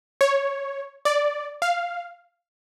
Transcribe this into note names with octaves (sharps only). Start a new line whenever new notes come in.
C#5
D5
F5